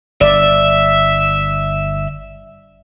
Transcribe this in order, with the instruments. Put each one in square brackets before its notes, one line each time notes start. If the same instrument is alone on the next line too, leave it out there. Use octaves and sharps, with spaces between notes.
[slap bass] G1 [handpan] D5 [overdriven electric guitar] E5